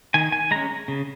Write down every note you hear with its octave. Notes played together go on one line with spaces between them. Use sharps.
D#3 G#5
G#5
G#3 C#4 A#5
C#3